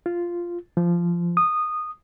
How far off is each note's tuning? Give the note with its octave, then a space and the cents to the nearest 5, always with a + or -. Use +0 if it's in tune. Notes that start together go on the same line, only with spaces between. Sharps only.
F4 -5
F3 -15
D#6 -15